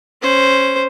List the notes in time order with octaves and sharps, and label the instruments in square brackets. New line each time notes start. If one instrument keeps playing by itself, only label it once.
[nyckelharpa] C#4 C5